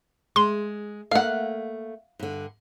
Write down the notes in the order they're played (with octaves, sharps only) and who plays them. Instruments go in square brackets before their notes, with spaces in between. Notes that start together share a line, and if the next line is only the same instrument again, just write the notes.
[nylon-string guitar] G#3 [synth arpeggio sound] C6
[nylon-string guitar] A3 A#3 [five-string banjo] F5 F#5
[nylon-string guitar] G2 D3